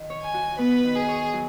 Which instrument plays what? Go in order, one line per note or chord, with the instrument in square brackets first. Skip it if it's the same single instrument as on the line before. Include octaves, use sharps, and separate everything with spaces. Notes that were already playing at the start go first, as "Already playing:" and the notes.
Already playing: [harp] D#3
C#5
[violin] G#5
[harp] F#4
[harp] B3 [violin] B4
[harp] D#3
[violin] G#4
[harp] C#5
F#3